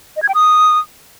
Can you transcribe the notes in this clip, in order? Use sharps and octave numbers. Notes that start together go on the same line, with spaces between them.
D#5
G#6
G5
D#6